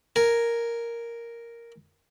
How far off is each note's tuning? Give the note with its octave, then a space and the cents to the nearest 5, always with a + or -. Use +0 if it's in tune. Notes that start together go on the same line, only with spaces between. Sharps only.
A#4 +0 G#5 +0